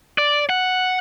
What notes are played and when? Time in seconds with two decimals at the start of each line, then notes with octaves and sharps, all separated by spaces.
0.18 D5
0.49 F#5